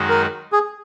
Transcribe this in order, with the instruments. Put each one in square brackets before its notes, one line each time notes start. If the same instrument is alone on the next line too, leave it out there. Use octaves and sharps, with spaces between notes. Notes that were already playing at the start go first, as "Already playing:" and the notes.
Already playing: [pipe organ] F#2 D#3 G#3 D#4 F#4
[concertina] A#4
G#4